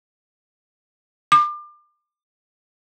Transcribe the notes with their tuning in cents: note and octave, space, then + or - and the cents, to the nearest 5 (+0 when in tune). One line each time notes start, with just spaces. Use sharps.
D6 +30